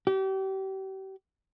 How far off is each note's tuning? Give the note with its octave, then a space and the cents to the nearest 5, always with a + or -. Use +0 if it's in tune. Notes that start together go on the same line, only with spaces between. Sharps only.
G4 -35